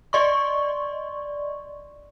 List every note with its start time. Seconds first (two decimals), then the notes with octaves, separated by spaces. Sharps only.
0.13 D5 D#5 C6 C#6